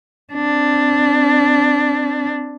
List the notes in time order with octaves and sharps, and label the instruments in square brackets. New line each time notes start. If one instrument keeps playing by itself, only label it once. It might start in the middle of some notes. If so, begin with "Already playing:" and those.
[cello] C4 D4